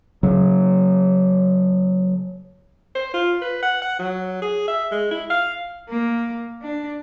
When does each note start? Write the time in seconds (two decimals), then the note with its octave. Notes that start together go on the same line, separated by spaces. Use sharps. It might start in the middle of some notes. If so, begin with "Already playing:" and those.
0.23 C#3 F#3
2.95 C5
3.14 F4
3.42 B4
3.63 F#5
3.82 F#5
3.99 F#3
4.42 G#4
4.67 E5
4.91 G#3
5.11 E4
5.30 F5
5.89 A#3
6.62 D4